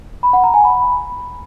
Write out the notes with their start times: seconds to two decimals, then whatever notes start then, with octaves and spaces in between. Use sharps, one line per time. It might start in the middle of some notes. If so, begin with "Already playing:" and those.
0.23 B5
0.33 F#5
0.44 A#5
0.54 G#5
0.64 B5